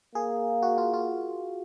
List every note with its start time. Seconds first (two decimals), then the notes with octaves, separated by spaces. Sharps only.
0.15 A#3 G#4
0.62 F#4
0.78 F4
0.93 F4